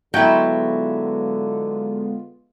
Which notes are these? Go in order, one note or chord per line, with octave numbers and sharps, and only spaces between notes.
D3 F#3 G#3 B3 E4 F4 G5